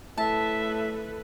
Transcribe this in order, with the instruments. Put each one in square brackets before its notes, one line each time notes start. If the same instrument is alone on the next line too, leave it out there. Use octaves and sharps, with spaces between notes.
[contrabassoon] A2 [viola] A4 B4 [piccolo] E5 [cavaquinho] A5